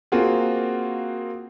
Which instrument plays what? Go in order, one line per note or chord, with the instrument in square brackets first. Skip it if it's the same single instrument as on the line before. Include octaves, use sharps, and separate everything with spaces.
[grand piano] A#3 C4 F4 F#4 G#4